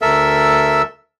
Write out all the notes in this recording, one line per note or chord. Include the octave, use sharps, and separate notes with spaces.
D2 A4 A#4 E5 E6